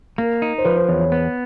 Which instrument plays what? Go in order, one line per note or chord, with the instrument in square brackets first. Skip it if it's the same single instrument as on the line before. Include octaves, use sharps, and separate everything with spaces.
[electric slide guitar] A#3 [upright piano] A#4
[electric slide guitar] D#4
[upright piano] C5
[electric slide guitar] F3 [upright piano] B4
[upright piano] C5
[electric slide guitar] E2 [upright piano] C#5
[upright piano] C#5
[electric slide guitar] B3